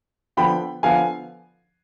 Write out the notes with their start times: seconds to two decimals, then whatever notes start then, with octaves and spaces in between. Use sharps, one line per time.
0.37 D3 F3 B3 G5 B5
0.83 D3 F3 B3 F5 G#5